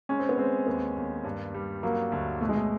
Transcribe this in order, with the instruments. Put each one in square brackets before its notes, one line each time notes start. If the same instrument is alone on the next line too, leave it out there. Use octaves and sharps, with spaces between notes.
[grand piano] G#3 [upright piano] C#4
[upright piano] C4
B3
[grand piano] G#3 [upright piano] C4
[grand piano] D#2 [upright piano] B3
[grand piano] D#2
G2
G3
[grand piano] F#3 [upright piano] A#3
[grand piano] D2
[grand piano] B2 [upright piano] A3
[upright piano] G#3
A3